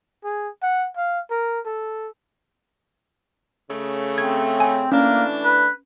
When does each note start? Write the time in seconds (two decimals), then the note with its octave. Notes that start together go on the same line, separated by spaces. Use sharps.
0.24 G#4
0.62 F#5
0.97 F5
1.30 A#4
1.66 A4
3.70 C#3 A3
4.18 C4 G#6
4.60 G#5
4.92 E3 A3 A#3 C#4 D4
5.44 B4